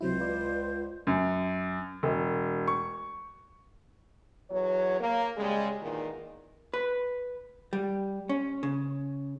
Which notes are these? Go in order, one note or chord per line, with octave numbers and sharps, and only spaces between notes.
C#2 C3 F#3 E4 C5
F4 B4 D5
F#2
E1
C#6
E2 F#3 C#5
A#3
C#3 G3 G#3
E2 A#2 D#3
B4
G3
C#4
C#3